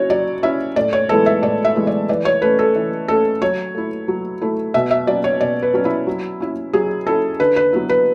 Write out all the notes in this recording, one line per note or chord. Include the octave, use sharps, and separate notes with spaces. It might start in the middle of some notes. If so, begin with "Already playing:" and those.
Already playing: C#4 E4 F#4 C#5
F#3 D5
C#4 E4 E5
A2 D5
C#5
E3 G#3 B3 E4 A4
E5
A2 D5
E5
E3 G#3 B3 E4
D5
E3 D5
C#5
A3 C#4 B4
A4
E3
A3 C#4 A4
F#3 C#5
A3 E4
F#3
A3 E4
B2 E5
E5
F#3 C#4 D5
C#5
B2 D5
B4
F#3 C#4
E4
F#3
C#4 E4
F#3 G#4
C#4 E4 A4
D3 B4
B4
F#3 B3 E4
B4